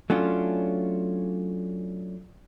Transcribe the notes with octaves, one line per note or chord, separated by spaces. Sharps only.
F#3 A3 C#4 D4 F4